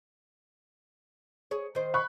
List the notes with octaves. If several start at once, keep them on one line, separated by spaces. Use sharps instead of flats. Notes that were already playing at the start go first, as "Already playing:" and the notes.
G#4 C#5
D#3 C5
B5 C#6 F#6